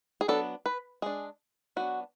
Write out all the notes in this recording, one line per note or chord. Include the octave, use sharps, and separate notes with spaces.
G#4
F#3 B3 D4 A4
B4
G#3 D4 G#4
F#3 B3 D4 F#4